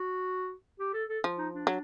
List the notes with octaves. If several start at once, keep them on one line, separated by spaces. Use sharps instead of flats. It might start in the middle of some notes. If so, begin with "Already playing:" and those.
Already playing: F#4
G4
A4
A4
F3
D#4
D4
F#3